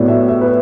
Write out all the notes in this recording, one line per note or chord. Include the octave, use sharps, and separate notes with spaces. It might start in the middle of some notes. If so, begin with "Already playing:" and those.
Already playing: A2 F#3 B3 D5
E5
E5
B4